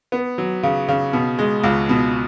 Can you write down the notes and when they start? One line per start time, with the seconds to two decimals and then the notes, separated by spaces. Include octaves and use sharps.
0.12 B3
0.38 F#3
0.63 C#3
0.88 C#3
1.13 B2
1.38 G#3
1.63 C#2
1.89 B2